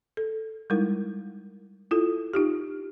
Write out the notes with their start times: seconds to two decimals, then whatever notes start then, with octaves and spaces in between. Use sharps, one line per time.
0.17 A4
0.70 G3 G#3 D#4 E4 A#4
1.91 E4 F4 A4
2.34 D#4 F4 G4